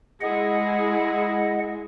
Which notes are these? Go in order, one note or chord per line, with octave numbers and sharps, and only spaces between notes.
G#3 E4 G#4 D#5 F#5